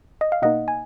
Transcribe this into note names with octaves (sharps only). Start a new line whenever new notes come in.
D#5
F5
B2 A#3 D#4 D#5 F#5
G#5